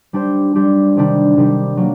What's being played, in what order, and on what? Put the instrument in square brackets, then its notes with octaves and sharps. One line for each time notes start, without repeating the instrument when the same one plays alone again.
[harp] G3 D4 G4 C5
G3 D4 G4 C5
C3 D#3 G3 D4
C3 D#3 G3 D4
F#3 A#3